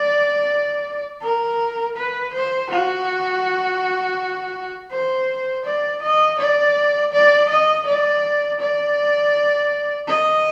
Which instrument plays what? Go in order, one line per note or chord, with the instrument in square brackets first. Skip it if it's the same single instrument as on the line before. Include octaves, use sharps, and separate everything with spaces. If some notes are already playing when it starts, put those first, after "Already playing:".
Already playing: [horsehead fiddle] D5
A#4
B4
C5
F#4
C5
D5
D#5
D5
D5
D#5
D5
D5
D#5